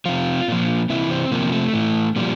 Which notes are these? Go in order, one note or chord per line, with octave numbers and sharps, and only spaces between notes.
C3 F3 F4
A#2 F3
C3 E3 E4
C4
C3 F3 A#3
A3
A2 E3
A#2 F3 G3